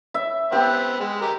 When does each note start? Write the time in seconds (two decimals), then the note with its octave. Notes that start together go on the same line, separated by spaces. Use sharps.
0.14 E5
0.52 B3 C4 G4
1.00 G#3
1.21 G4 A#4